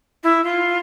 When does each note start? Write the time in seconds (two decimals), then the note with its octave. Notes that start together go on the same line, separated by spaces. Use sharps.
0.23 E4
0.44 F4